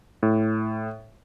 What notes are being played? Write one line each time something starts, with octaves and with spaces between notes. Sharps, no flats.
A2